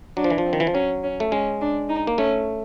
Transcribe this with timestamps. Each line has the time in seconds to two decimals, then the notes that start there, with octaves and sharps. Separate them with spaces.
0.17 F#3 D4
0.24 F3
0.30 E3
0.38 F3
0.46 C4
0.53 D#3
0.60 E3
0.67 F3
0.74 F#3 C#4
1.04 C#4
1.20 A3
1.31 G#3 C#4
1.61 D4
1.89 D#4
2.07 A#3
2.18 A3 C#4